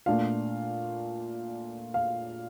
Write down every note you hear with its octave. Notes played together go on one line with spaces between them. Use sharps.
A#2 A3 D4 F4 F5
F5